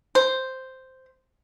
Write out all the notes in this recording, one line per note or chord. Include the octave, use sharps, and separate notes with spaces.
C5